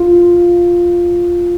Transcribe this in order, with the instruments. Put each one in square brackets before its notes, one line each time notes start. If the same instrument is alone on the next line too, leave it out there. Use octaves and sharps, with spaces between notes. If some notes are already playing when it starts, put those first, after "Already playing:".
Already playing: [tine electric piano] F4